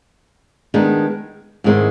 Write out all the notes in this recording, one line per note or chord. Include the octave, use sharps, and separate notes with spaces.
D#3 G#3 B3 D4
G#2 D#3 G#3 C4 E4